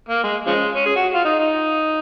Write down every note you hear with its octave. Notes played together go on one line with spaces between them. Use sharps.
A#3
G#3
C#3 F3 G#3
C#4
G#4
F#4
F4
D#4
D#4